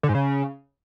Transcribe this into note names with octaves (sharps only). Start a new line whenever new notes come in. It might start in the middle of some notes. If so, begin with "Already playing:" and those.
D3
G#2
C#3